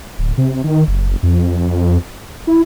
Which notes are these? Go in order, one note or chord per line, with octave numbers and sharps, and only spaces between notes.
D1
C3
D#3
F#1
F2
E4